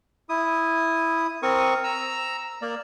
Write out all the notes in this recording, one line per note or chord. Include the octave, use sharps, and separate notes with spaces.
E4 D#6
C4 A#4 C#6 D#6
A#5 E6
A#3 D5